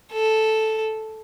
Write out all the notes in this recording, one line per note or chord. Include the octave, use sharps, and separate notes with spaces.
A4